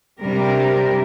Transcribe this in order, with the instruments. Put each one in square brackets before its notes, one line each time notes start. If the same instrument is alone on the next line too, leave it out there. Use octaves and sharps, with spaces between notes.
[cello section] C3 G3 D4 A#4